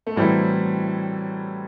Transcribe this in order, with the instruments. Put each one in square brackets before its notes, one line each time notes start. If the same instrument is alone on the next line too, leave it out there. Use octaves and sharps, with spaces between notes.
[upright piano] A3
[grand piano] A2 F#3 C4 E4 [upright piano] E3 G3